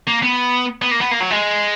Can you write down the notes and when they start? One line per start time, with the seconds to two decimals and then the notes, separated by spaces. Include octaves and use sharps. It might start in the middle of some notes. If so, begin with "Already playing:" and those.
0.08 A#3
0.23 B3
0.82 B3
0.91 A#3
1.01 B3
1.11 A#3
1.20 F#3
1.30 G#3